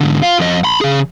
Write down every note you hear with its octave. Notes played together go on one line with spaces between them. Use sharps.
G#2 D3
F4
F2 D#5
B5 C6
C#3 G#4